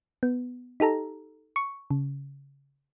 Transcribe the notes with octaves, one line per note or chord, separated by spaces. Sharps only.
B3
D#4 G4 A4 A#5
C#6
C#3